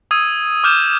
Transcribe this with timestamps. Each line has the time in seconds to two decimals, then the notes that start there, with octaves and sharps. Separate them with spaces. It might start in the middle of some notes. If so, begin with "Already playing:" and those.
0.11 D#6 E6 G#6 D#7
0.64 D6 F6 G6 E7